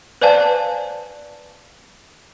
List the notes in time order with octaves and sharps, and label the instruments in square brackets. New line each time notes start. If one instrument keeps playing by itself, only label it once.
[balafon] B4 C5 D5 F5 G#5 A5